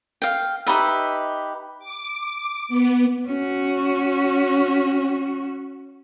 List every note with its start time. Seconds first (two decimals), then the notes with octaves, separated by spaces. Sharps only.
0.22 F5 G5
0.67 D#4 G4 B4 E5
1.79 D6
2.69 B3
3.27 C#4 F#4